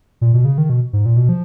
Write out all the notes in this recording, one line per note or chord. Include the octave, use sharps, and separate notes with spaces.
A#2
B2
C#3
D#3
B2
G#2
A#2
B2
F3